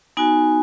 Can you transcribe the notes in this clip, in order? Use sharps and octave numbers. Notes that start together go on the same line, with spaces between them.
B3 D#4 F#4 G#5